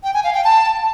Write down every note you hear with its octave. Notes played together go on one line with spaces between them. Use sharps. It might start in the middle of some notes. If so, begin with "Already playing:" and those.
G5
G#5
F5
G5
A5